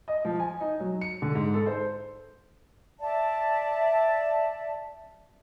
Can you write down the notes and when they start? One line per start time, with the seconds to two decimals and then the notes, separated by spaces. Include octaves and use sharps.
0.08 D#5
0.25 F3
0.40 G#5
0.60 D#4
0.80 F#3
1.01 C#7
1.22 D3
1.35 G#2
1.54 A4
1.66 C5
3.00 D5 E5 A5